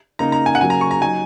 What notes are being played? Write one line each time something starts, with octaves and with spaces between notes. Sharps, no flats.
C#3 A#3 D#4 A#5
A#5
G#5
F#5
C#3 F#3 A#3 G#5
A#5
C#6
A#5
F#3 D#4 G#5